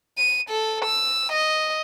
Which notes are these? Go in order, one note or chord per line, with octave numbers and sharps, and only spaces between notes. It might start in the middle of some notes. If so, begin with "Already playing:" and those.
D#7
A4
E6
D#5